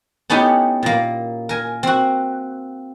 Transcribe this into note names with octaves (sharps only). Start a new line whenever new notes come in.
A3 B3 C#4 D#4 E4 G4
A#2 A#3
A#4 G#5
C4 F#4